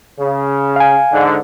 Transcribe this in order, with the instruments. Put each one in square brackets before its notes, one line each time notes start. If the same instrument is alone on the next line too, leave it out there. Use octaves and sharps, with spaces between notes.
[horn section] C#3
[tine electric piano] F5 G#5
[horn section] G#2 D3